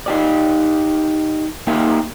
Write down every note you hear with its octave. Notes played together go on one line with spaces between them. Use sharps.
D#4 G4 D5
A#3 D#4 G4 E5 G5